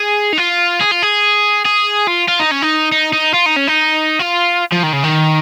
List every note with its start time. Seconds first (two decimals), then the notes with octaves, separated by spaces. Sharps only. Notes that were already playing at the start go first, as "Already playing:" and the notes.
Already playing: G#4
0.33 D#4
0.38 F4
0.81 G#4
0.91 F4
1.03 G#4
1.65 G#4
2.07 F4
2.28 F4
2.40 D#4
2.51 C#4
2.62 D#4
2.92 D#4
3.13 D#4
3.34 F4
3.46 D#4
3.56 C#4
3.67 D#4
4.19 F4
4.72 F3
4.83 D#3
4.93 C#3
5.03 D#3